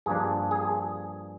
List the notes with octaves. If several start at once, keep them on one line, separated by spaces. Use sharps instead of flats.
G2 F3 A#3 D4 G#4
G#4